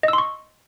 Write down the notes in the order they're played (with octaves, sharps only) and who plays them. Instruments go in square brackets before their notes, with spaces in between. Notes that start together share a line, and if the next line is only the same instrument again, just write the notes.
[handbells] D#5
E6
C6
C#6